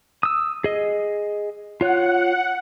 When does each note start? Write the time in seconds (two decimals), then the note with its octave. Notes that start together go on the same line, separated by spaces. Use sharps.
0.23 D#6 E6
0.64 G#4 D#5
1.81 F4 C#5 F#5